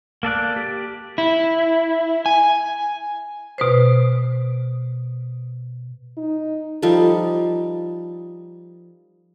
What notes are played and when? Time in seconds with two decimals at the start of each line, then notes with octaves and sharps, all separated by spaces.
0.23 A#3 A4 D5 F#6
0.56 G4
1.18 E4
2.26 G#5
3.58 B2 B4 C5
6.17 D#4
6.82 F3 G3 D#4 A4